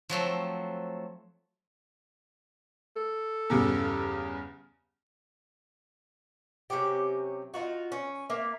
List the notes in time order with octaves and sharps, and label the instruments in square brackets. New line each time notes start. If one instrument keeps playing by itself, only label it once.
[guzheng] F3 F#3 A3 C4
[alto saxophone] A4
[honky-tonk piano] E2 G2 C#3
[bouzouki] C3 F#3 C#4 G4
D#4 F4 F#4
C#4
A#3 E5 F5